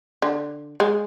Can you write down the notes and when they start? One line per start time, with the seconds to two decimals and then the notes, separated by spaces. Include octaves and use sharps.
0.22 D3
0.80 G#3